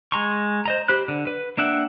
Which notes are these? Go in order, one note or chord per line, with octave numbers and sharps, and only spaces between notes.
G#3 G#5 A#5 C6 C#6
C5 D#5 A#5
G4 C5 B5 F#6
D3
B4
A#3 D4 E5 F#5 G5